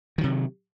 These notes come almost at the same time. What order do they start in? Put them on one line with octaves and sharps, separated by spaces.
D#3 F#3 C3